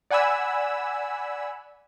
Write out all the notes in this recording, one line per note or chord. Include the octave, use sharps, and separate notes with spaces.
D5 F#5 G#5 B5 E6